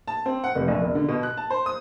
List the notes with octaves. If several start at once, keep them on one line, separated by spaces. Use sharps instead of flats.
A5
C4
F#5
F1
A#1
E1
D3
B2
F#6
A5
C5
D#6